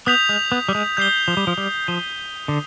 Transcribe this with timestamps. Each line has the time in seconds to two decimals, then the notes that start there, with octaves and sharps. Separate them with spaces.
0.06 B3 D#6 G6 B6 F7
0.29 G#3
0.52 B3
0.69 G3
0.75 G#3
0.97 G3 G6 C7 G7
1.28 F3
1.37 G3
1.47 F3
1.58 G3
1.88 F3 G6 C7 D#7 G7
2.48 D3